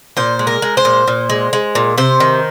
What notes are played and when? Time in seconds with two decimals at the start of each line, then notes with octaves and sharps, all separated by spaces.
0.17 A#2 C5
0.39 G#3
0.47 A#4
0.62 G#3
0.77 C5
0.85 A#2
1.07 A#2
1.29 G#3
1.53 G#3
1.75 A#2
1.98 C3 C5
2.20 D#3